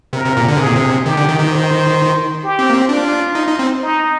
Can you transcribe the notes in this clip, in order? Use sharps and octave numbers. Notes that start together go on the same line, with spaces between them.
C3 A#4
C3
A#2
D3
C3 G#4
A#2
C3
D#3 G4
D3
D#3
D#3
C5
G4
C4
A#3
C4
D4 F4
D#4
D#4
C4
D#4